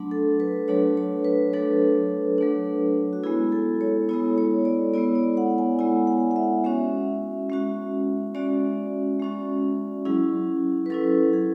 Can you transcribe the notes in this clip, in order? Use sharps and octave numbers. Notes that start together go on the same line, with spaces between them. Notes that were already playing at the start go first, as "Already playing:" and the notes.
Already playing: F#3 A3 D4
A4
B4
F#3 A3 D4 C#5
C#5
B4
F#3 A3 D4 A4
F#3 A3 D4
F#4
G#3 B3 E4 G#4
A4
C#5
G#3 B3 E4 C#5
C#5
D5
G#3 B3 E4 D5
D5
F#5
G#5
G#3 B3 E4 G#5
F#5
F#5
E5
G#3 C#4 F#4 E5
G#3 C#4 F#4
G#3 C#4 F#4 D5
G#3 C#4 F#4
F#3 C#4 E4 G#4
B4
F#3 C#4 E4 A4
G#4